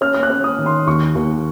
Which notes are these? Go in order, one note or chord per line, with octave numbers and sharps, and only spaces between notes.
C#4 F6
F6
F#6
C#4
D#6
D#3
C6
D#2 C#6
D#2